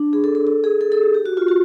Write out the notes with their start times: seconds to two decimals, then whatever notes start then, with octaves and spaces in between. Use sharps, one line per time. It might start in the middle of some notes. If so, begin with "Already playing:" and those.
Already playing: D4
0.13 G#4
0.24 A4
0.35 A4
0.47 A4
0.64 G#4
0.81 A4
0.92 A4
1.03 G4
1.14 G4
1.26 F#4
1.37 F4
1.48 F#4